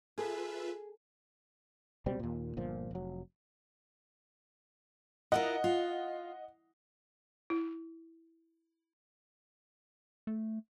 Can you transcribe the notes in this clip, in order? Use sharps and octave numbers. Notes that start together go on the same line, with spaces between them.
F4 G#4 A4 B4 E5 A5
C#2 B2 G3 C4
D#2 A#2
G1 A#2 F3
F1 F#3
E4 F4 A#4 D#5 F#5
F4
E4
A3